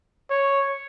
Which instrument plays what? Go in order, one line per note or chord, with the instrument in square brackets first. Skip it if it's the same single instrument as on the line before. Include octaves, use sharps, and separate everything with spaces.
[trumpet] C#5